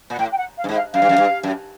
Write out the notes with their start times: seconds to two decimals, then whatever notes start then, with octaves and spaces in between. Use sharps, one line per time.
0.10 A#2 F#5
0.19 A2 G5
0.32 G5
0.37 F#5
0.56 F5
0.64 G2
0.69 G#2
0.75 F5
0.93 F#2 F5
1.02 G2
1.09 F#2
1.18 G2
1.43 F#2